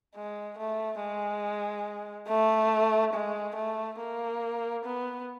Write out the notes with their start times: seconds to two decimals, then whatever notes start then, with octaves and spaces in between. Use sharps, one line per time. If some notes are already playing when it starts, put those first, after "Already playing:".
0.15 G#3
0.57 A3
1.00 G#3
2.28 A3
3.13 G#3
3.55 A3
3.99 A#3
4.84 B3